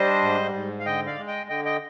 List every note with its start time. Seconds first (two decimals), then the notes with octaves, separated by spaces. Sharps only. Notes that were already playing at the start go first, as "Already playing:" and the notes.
Already playing: G3 D4 C5 D#5
0.22 G#2
0.54 G#2
0.80 F5
0.86 D3 D#5 G5
1.06 D5 F5
1.18 G#3
1.28 D#5 G5
1.49 D3 D#5 G5
1.65 D#5 G5